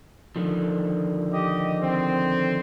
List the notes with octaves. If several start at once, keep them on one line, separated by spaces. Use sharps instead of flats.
D3 D#3 F3
G4 D#5
C4